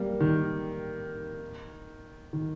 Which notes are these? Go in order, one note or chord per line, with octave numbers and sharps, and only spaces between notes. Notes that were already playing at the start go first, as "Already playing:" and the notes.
Already playing: G3 A#3
D#3
D#3